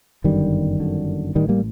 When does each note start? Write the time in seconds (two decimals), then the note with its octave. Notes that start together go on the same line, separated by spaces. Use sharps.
0.24 G1 F#2 D3 D#3 G3
0.80 G1 F#2 D3
1.35 A1 A2 D#3 G3
1.49 G3 A#3